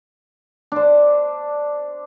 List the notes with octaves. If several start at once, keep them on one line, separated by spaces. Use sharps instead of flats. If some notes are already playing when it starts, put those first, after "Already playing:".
D4 C5